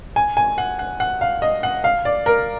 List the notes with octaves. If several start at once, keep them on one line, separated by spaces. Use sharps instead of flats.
G#5
G#5
F#5
F#5
F#5
F5
D#5
F#5
F5
D5
A#4